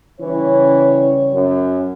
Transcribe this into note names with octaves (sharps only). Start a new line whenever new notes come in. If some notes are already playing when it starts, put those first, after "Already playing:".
C#3 E3 G3 C#5
F#2